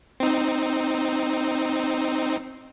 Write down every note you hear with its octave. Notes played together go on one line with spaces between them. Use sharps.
C4 D#4